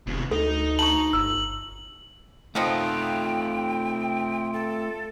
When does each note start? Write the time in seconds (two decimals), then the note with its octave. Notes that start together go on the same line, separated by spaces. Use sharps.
0.07 E1 D#2 C3
0.31 D2 D#4 A4
0.79 A5 A#5 C#6 F#7
1.13 G1 E6
2.55 D#3 F3 A3 B3 C4 F4 G5
4.53 A4